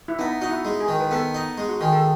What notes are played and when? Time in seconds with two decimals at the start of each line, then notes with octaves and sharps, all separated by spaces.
0.08 E4
0.19 B3 D#4
0.41 D#4 F#4
0.50 E4
0.65 G#3
0.80 G#4
0.88 D#3
1.00 B4
1.11 B3 A4
1.34 D#4
1.58 G#3
1.69 F#4
1.81 D#3 G#4
1.93 A4